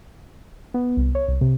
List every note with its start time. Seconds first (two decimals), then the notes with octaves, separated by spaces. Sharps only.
0.74 B3
0.97 C2
1.15 C#5
1.28 C2
1.41 C3